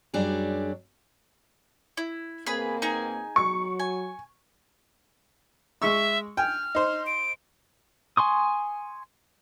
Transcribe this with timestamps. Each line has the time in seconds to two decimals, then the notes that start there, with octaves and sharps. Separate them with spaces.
0.14 F#2 F#3 G3 D4 G4 G#4
1.97 E4
2.47 B2 A#3 C4 G#4 B4 B5
2.82 D#4 G#4 G#5
3.36 F#3 C#6
3.79 G#5
5.82 G#3 E5 C#6 E6
6.37 G5 G#5 F6
6.75 D#4 C5
7.06 D7
8.17 G#5 C6 C#6 D#6